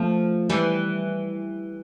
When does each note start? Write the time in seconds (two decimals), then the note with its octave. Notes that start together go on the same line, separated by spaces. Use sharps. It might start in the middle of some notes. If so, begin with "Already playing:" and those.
Already playing: F3 A3
0.50 E3 G3